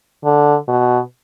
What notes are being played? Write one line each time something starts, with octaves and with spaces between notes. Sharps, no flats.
D3
B2